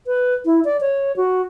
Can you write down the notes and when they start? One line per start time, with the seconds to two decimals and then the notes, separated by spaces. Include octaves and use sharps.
0.07 B4
0.45 E4
0.65 D5
0.81 C#5
1.16 F#4